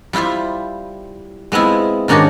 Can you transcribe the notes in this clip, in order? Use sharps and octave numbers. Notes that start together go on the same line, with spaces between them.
G3 E4 F4 C5 E5
G#3 B3 C4 E4 F4
G#2 D#3 C#4 D4 F#4 G4